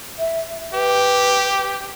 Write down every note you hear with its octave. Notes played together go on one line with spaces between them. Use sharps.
E5
G4 B4